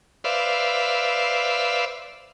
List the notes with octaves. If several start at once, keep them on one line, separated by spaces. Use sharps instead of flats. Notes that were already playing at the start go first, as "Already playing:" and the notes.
B4 C5 D5 E5 F5